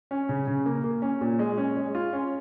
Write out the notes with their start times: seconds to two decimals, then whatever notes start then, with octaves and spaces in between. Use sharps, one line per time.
0.11 C#4
0.29 C#3
0.47 C#3
0.66 A#3
0.84 A#3
1.02 C#4
1.21 A#2
1.39 G#3
1.57 C#4
1.76 G#3
1.95 F4
2.13 C#4